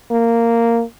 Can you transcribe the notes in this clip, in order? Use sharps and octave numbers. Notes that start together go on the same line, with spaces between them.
A#3